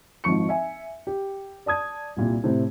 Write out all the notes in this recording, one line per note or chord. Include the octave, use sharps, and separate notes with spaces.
G#1 G#2 F3 C#6 C#7
E5 G#5
G4
D5 A5 D#6 G#6
C2 A#2 G3
A2 C3 C4